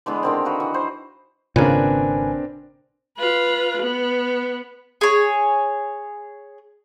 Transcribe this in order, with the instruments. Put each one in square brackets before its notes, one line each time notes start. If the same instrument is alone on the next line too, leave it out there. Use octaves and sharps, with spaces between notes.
[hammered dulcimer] D3 E3 G#3 B3
D3 D#3 C4
F#4 B4 F5 F#5
E3
C5
[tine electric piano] G#1 B4 G#5 [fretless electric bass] A#2 C#3 [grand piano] C4 D4 A#4
[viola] F4 B4
B3
[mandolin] G#4 C#5